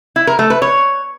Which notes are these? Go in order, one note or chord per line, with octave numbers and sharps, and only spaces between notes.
E4
A#4
A3
B4
C#5